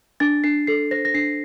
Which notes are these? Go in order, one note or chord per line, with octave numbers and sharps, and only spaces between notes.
D4 A6
D4 C7
A4 C7
C5 A#6
A#6
D4 C7